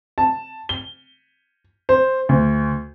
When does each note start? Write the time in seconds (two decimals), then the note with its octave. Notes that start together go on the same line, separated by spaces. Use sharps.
0.18 A5
0.69 G7
1.89 C5
2.29 D2